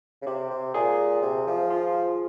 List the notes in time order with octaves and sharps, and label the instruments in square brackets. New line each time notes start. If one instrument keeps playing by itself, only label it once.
[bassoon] C#3
[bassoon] C3 [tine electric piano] G4
[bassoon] C3
[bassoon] A#2 [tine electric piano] G#4
[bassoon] C3
F3
[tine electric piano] F4